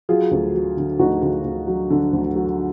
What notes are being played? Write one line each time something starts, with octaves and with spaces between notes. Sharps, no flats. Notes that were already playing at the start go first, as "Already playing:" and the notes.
F#3 F4 G#4
D2
F#3
D3
D2 D#4 F#4
D2
D2
F#3
D3
D2
F#3